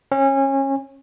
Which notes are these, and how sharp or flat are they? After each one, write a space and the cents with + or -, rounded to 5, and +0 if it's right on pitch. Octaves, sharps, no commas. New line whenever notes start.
C#4 -25